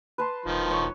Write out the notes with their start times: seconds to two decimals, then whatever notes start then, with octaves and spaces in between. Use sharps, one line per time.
0.18 B4 A5 C6
0.46 E1 D#3 F3
0.71 C#5